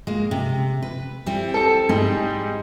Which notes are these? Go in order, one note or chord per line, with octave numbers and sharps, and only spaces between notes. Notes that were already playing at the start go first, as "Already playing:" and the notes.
G#3 A#3
C3
B4
G3 C4 E4
A4 A5
G#2 G3